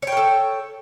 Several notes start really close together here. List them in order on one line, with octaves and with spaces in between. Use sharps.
C#5 G5 A#4 A4